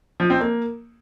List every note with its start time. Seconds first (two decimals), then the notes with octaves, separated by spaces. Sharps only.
0.20 F3
0.30 C4
0.40 A#3